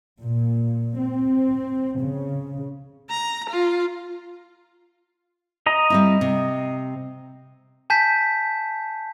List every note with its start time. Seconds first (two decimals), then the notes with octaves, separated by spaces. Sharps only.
0.22 A#2
0.99 C4
2.02 C#3
3.10 A#5
3.50 F4
5.66 D#5 A#5
5.90 G3 C4 E4
6.21 C3
7.90 G#5 A5 G6 B6